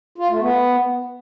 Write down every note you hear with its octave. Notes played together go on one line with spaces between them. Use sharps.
F4
A3
B3